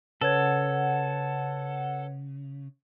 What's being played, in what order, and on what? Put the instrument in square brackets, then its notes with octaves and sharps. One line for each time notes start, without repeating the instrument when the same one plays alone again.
[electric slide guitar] C#3 [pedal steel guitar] A4 [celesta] B4 C#5 G#6 [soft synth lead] F#5